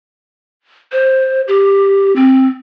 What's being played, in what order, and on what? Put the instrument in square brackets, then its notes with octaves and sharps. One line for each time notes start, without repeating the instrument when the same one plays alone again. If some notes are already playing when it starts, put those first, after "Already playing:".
[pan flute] C5
G4
C4